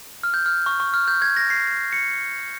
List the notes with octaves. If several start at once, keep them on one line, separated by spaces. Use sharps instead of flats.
F6
G6
F6
C#6
C#6
F6
G6
G#6
A#6
C7
C#7